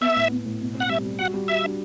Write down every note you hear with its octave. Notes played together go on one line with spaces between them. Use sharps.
B3 E5
A2
B3
A2
B2
C4
F#5
G3 E5
G3
F#4 F#5
G3
F#4 E5
D4